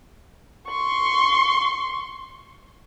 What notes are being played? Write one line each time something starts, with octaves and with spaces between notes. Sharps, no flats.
C6 C#6